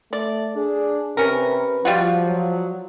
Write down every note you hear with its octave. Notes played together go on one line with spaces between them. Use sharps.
A3 D5
D4 G#4
C3 C#4 A#4 B4
F3 G3 F4 F#4
F#3